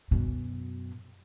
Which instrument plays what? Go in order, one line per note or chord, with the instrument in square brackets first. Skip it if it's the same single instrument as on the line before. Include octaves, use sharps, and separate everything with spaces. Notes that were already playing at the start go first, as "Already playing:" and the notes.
[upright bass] F#2 B2